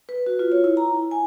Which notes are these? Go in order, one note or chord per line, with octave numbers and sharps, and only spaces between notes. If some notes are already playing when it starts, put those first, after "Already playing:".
B4
F#4
F4
C#5
E4
A#5
E4
G#5